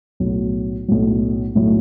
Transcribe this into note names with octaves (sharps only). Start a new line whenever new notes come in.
B1 A2 F#3
B1 A2 F#3
B1 A2 F#3